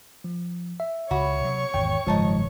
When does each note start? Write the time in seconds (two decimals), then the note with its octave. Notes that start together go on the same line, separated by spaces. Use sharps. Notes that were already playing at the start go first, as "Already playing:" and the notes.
0.24 F3
0.80 E5
1.11 C#2 C#3 F#4 C#5 B5 C#6 D6
1.41 C3 F#3
1.74 G#1 E2 G5
2.07 F#1 G#2 D#3 F3 G#3 D#4 A5 D#6